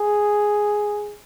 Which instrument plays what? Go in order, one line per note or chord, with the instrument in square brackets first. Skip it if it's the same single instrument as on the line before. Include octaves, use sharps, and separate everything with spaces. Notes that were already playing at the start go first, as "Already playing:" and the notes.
Already playing: [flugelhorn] G#4